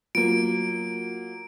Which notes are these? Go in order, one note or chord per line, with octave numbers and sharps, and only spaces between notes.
F#3 A#3 F4 D7